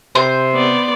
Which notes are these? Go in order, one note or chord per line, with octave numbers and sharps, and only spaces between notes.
C3 C5
B3 D5